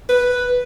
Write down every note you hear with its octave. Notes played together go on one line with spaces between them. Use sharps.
B4